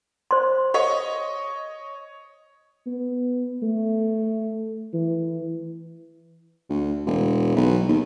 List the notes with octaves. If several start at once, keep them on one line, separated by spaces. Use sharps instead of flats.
C5 C6
C#5 D#5
B3
A3
E3
D2
E1
B1
D#2